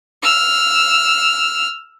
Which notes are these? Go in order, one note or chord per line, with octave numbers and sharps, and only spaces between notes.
E6 F6